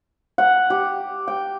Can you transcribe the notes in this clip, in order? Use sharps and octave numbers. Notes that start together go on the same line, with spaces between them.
F#5
G4
G5